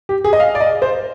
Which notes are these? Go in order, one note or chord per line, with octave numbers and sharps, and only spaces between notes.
G4
G#4
D#5
F5
D5
D#5
C5